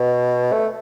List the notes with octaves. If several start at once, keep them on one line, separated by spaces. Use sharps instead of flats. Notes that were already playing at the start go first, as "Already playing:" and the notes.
Already playing: B2
A3